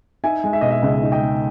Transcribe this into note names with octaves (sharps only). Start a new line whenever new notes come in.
D#4 E5 G#5
G#3
E5
B2 D#5
E5
C#2 E5
D#4
D#5 G5
G#3